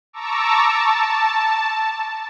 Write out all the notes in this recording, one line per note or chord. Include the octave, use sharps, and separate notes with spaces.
A5 A#5 C#6 D6 E6
A5